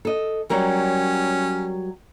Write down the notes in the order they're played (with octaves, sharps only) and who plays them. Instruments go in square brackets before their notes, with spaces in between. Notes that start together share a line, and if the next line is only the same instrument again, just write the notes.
[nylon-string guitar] A4 D#5
[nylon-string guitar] F#3 G3 A#4 [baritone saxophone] C#4